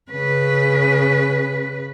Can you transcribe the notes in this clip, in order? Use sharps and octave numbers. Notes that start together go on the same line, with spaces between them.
C#3 B4